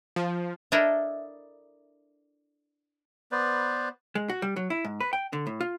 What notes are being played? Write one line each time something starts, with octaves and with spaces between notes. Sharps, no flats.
F3
D4 E4 A4 A#4 D#5 E5
B3 B4 C5 D5
G#3
F#4
G3
F#3
E4
G#2
B4
G5
D3
A2
F4